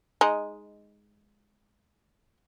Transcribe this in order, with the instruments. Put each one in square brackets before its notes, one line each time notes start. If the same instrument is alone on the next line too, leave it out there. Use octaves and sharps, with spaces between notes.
[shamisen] G#3 D#4